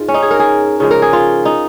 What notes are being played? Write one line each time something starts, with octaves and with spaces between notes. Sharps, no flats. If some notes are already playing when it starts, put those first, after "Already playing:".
Already playing: G#2 G#3 F4
C#4
D#4
G#4
A#4
G#4
C#3 F3 G#3
A#4
G#4
F4
D#4